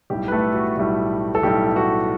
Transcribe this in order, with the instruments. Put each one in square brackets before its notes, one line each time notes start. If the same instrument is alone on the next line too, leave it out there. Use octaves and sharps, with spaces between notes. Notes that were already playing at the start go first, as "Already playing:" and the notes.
[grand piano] B1 A2 G3 G4
B4
A3 A4
F#4
B1 A2 G3
A4
B1 A2 G3 G4
F#4